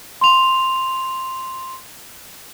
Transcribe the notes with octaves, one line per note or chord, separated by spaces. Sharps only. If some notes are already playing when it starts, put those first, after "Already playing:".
C6 F7